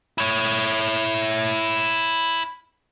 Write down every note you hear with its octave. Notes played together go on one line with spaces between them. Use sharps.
E4 C#5